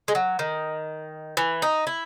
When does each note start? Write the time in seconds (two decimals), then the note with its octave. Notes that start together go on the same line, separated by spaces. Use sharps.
0.08 G#3
0.15 F#3
0.39 D#3
1.37 E3
1.62 D#4
1.87 E4